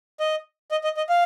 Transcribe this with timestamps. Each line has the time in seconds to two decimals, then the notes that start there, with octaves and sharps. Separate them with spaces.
0.20 D#5
0.71 D#5
0.84 D#5
0.97 D#5
1.09 F5